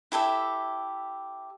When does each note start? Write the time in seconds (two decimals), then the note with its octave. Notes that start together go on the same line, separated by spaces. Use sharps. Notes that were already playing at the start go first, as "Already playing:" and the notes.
0.12 E4 G4 A4 E5